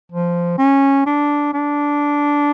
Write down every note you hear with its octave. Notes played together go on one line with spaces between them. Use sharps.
F3
C#4
D4
D4